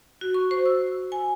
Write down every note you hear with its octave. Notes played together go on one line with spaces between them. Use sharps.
F#4
C#6
C5
E6
G#5